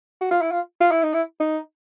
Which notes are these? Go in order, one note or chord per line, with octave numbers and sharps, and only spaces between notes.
F#4
F4
E4
F4
F4
E4
D#4
E4
D#4